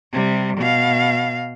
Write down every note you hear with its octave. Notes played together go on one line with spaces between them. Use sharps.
C3 G3
B2 F5